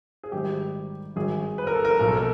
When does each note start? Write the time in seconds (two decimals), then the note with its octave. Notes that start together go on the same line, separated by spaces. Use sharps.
0.24 G#4
0.32 G#1 G#2 D#3 G3 G4
1.16 G#1 G2 D#3 G#4
1.58 B4
1.67 A#4
1.75 A4
1.85 A#4
1.99 B1 A#2 F3 A#4
2.08 A4
2.17 A#4